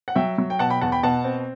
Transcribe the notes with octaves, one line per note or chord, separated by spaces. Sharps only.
F#5
F#3 E5 G5
F#3
G5
B2 F#5 A5
G5 B5
E2 F#5 A5
G5 B5
B2 F#5 A5
C4